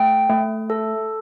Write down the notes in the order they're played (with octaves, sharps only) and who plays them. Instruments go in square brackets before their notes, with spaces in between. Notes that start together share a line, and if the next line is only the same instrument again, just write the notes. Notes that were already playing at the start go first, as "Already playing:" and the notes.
Already playing: [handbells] A3 G5
A3
A4